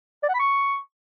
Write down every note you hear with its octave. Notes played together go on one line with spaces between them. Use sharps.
D5
F#5
B5
C#6